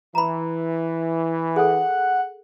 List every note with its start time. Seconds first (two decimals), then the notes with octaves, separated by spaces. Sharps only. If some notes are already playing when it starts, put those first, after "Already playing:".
0.15 E3 A#5 B5
1.56 G#4 A4 F#5